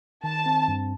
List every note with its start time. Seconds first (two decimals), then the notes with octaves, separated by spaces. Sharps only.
0.24 D#3 A5
0.46 C4
0.68 G2